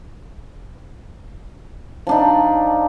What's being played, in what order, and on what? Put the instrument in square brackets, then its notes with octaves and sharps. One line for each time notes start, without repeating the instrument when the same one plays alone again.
[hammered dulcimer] F3 D4 D#4